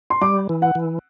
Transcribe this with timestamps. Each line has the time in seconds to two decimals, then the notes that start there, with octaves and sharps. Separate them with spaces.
0.10 C6
0.21 G3 D6
0.49 E3
0.62 F#5
0.75 E3